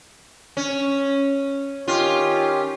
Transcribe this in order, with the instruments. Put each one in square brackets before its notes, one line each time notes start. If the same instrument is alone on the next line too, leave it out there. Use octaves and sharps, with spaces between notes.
[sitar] C#4
[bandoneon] D#3 C#4 G4 [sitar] F4